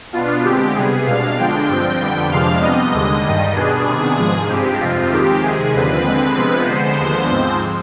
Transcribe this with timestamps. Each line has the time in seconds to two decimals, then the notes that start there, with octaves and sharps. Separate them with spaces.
0.13 B2 B3 D4 F4
0.44 D3 G#3 C4 G4
0.75 C3 G3 B3 G#4
1.07 B2 G#3 D4 F5
1.38 D3 F3 G#3 D4 G5
1.69 G2 F3 C4
2.00 F2 D3 G3 B3
2.31 F2 C3 F3 G#3 D4 F5
2.62 C3 G3 B3 D#5
2.93 D#2 D3 G#3
3.24 G2 D#3 G3
3.55 B2 B3 D4 G#4
3.87 C3 D#3 B3 D4
4.18 G#2 F3 G#3
4.49 G2 F3 G#3 C4 G4
4.80 F2 C3 F3 C4 F4
5.11 D#2 D#3 G#3 C4 G4
5.43 C3 D#3 G#3 G#4
5.74 D#2 D3 F3 C4 B4
6.05 D3 G#3 C4
6.37 C3 F3 G#3 B3
6.68 D3 G#3 B3 C5
6.99 D#2 D3 F3 G#3 B3
7.31 G#2 F3 G#3 C4